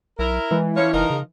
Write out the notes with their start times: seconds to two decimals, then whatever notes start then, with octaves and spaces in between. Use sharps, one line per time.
0.19 B1 E4 A#4
0.51 E3 G#3
0.77 F3 C#4 C#5
0.94 F1 F3 D#4 A#4
1.10 C#3